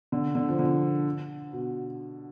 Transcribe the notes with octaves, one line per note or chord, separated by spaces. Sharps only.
D3
D3
F3
D3
B2